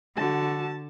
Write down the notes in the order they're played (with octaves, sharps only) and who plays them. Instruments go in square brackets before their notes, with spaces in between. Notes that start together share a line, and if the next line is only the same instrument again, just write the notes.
[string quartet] D3 [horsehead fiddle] F#4 A5